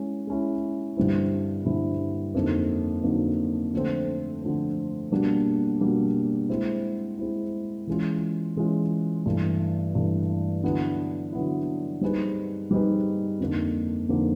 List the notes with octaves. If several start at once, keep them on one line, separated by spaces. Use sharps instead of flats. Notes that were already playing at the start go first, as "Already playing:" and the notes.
Already playing: G#3 C#4 E4
G#3 C#4 E4
G2 D3 G3 C4 E4
G2 D3 G3 C4 E4
F2 D3 F#3 A#3 D#4
F2 D3 F#3 A#3 D#4
D3 F3 A3 C4
D3 F3 A3 C4
B2 G3 A#3 D4
B2 G3 A#3 D4
G#3 C4 E4
G#3 C4 E4
E3 G#3 C#4 F4
E3 G#3 C#4 F4
G2 E3 A3
G2 E3 A3
D3 F#3 B3 E4
D3 F#3 B3 E4
G3 C4 D#4 G#4 B4
G3 C4 D#4 G#4 B4
F2 D3 F3 A#3 D#4
F2 D3 F3 A#3 D#4